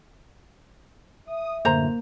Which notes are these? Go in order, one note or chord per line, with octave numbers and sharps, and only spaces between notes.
E5 D#6
F#2 A2 D3 A#3 C5 A#5